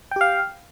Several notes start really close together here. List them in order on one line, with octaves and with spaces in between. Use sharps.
G5 G4 F5